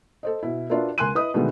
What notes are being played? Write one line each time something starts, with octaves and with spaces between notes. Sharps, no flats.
A4 C5 D#5
B2 E4
D4 F4 F#4 A#4 B4 E5
C#2 A#4 G#5 C6 F#6 D#7
E4 B4 D#5 D#6
B2 D3 D#3 G#3 A3 B3